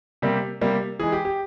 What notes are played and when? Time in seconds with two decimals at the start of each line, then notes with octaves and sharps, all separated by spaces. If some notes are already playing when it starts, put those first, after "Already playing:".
0.22 C3 G3 A#3
0.61 C3 G3 A#3
1.00 E3 G#3 G#4
1.12 G4
1.25 G4